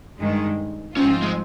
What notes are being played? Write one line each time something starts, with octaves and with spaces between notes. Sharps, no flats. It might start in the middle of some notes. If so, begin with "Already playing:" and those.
G2 D#3 G#3
G#2 F3 C4 C#4 F4
G#3